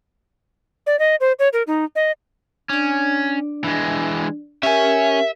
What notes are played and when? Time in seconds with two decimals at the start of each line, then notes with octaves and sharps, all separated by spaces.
0.87 D5
0.99 D#5
1.20 C5
1.39 C#5
1.53 A#4
1.67 D#4
1.96 D#5
2.69 C#4 D4 D5
3.64 E3 G#3
4.63 C#4 G4 A#4 E5 G#5